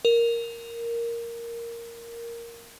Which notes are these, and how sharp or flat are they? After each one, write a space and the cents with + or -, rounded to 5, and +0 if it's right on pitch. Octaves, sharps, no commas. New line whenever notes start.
A#4 +0